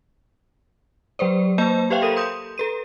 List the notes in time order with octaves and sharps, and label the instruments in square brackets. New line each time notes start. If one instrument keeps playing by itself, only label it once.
[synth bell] F#3 B4 C5 D5
A#3 C5 D#5 A5 G6
G4 B4 C5 E5 F5 G5
A4 A#4 D#6 D#7
C6 D#6 G6
A4 B4 D#7